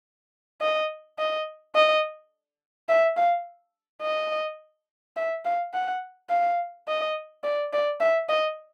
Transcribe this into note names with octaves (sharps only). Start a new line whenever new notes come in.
D#5
D#5
D#5
E5
F5
D#5
E5
F5
F#5
F5
D#5
D5
D5
E5
D#5